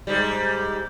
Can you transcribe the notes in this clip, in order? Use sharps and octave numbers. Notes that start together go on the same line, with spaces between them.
G#2 G3